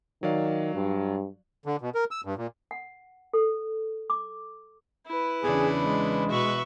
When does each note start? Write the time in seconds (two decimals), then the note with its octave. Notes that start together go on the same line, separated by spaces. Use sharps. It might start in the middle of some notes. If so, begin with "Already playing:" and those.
0.23 D#3 F#3 D5 F5
0.75 G2
1.66 D3
1.81 B2
1.95 A#4
2.11 E6
2.25 G2
2.37 A#2
2.71 F#5
3.33 A4
4.10 D6
5.07 E4 B4
5.43 E2 C#3 D4 G#4
5.78 G#3
6.30 B2 F#4 B4 E5 C#6